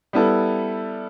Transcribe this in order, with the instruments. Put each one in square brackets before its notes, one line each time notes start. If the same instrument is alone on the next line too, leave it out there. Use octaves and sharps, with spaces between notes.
[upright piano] G3 B3 E4 A4